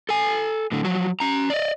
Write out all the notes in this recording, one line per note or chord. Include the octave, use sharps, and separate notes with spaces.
A4 G#5
A2 D3
F3 F#3
C#4 A#5
D5 D#5